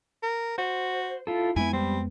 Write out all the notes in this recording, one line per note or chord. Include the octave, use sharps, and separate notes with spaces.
A#4
F#4 C5
E4 F4 A4
F2 G#3 B3 E4 G#5
G3 C4